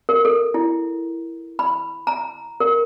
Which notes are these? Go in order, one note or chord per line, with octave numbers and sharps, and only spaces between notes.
A#4
A4
E4
B5
A#5
A#4